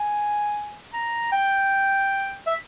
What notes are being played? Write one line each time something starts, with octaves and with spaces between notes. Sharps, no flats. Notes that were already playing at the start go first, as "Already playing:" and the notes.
Already playing: G#5
A#5
G5
E5